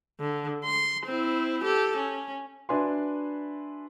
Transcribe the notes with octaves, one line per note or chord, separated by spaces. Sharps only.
D3
C6
C4 E4
G4 A4
C#4
D4 F#4 B4 E5 G#5 C6